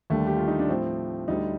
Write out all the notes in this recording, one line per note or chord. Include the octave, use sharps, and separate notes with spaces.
D#2 D3 G3 A3
G4
F4
D#4
D4
A2 F3 C4
D2 D3 G3 D#4